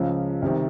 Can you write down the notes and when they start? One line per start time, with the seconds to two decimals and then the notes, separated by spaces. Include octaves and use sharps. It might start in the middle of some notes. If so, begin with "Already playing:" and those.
Already playing: C#2 C#3 F3
0.42 C2 C3 D#3